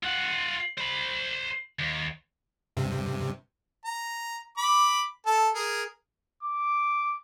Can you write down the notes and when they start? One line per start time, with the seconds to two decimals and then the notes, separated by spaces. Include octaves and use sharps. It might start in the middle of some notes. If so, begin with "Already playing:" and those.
0.03 F4 F#5
0.78 C5 B5
1.79 D#2
2.77 G2 C3
3.85 A#5
4.57 B5 D6
5.26 A4 A5
5.55 G#4 A#4
6.43 D6